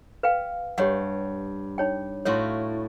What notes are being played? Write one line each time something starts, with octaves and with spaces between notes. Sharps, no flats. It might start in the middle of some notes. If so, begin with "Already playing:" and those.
B4 F5 G5
G2 G4 C#5 F#5
D#4 C#5 G5
A2 F#4 C#5 F5 C6